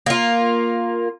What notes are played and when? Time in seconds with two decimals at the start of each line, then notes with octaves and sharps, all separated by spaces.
0.06 A#3 F4